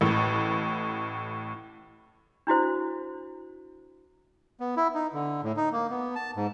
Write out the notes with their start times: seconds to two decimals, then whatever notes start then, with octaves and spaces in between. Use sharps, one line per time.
0.01 A1 A2
2.47 D4 E4 F#4 C5
4.60 B3
4.77 E4
4.94 D#4
5.13 D3
5.43 A2
5.57 D#4
5.72 A#3
5.90 B3
6.16 A5
6.36 G#2